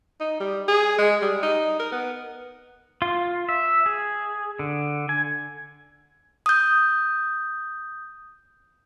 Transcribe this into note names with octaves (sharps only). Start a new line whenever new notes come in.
D#4
G3
G#4
G#3
G3
D#4
A#4
B3
F4
E5
G#4
D3
G#5
D#6 G6